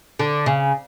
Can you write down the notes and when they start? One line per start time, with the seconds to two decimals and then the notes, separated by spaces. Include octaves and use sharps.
0.19 D3
0.46 C#3